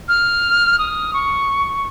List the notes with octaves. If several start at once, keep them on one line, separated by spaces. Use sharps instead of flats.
F6
D#6
C#6